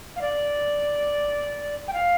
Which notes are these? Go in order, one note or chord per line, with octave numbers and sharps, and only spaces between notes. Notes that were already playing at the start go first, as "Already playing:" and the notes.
F5
D5
G5
F5